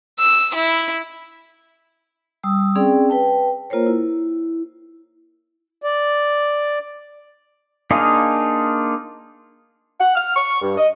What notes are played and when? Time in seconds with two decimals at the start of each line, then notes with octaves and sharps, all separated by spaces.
0.19 E6
0.54 E4
2.43 G3 D#6 E6
2.76 C4 C#4 G#4 D5 G5
3.10 B4 G5 A5
3.70 A#3 F4 A#4 C5 C#5
3.87 E4
5.82 D5
7.91 A#3 D4 D#4 F4 G#4
10.00 F#5
10.16 F6
10.36 C#6
10.61 G2
10.77 D#5